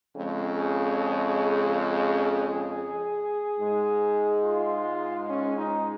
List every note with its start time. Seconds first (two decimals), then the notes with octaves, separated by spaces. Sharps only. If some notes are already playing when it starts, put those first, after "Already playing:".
0.14 F2 C#3 G#3
0.58 G#4
1.00 G#4
3.58 G#2 G#3
4.44 F4
5.30 C#4
5.59 D#4